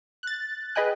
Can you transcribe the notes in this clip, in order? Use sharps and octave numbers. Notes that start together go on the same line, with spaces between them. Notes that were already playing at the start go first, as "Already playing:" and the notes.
F#6 A6
G#4 B4 D#5 G5 G#5 F#6